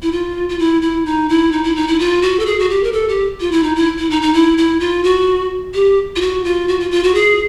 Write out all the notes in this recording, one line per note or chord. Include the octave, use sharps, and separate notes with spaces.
E4
F4
F4
E4
E4
D#4
E4
D#4
E4
D#4
E4
F4
F#4
A4
G#4
F#4
G4
A#4
A4
G4
F4
E4
D#4
E4
E4
D#4
D#4
E4
E4
F4
F#4
G4
F4
F#4
F4
F#4
F4
F4
F#4
G#4